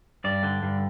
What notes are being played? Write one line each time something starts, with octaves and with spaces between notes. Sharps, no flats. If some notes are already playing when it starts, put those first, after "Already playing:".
G2 D5
D3
G2